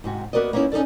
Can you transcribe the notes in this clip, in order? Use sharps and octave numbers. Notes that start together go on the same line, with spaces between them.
G#2 C3 F#4
A#3 B3 F#4 A#4 D5 D#5
A#3 B3 C#4 D#4 E4
C#4 D#4 G#4 A4 D5